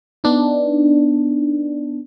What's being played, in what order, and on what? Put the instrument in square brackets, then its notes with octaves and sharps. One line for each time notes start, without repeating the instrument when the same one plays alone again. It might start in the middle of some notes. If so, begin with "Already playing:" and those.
[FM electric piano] B3 D4 D#4